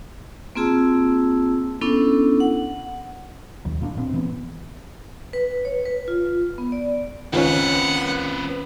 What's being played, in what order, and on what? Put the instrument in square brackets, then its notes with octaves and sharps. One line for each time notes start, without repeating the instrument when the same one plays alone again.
[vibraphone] A#3 C4 F4 G#4 A5 E6
B3 C#4 D4 E4 A4
F#5
[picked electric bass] D#1 D#2 F#3
A#2 A#3 C#4 D4
A#2 A#3 C4
A#2 E3 B3
[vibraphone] B4
C#5
B4
F4
B3
D5
[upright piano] C#2 [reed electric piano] D#3 C#4 [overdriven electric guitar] C4 B4 [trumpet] F#5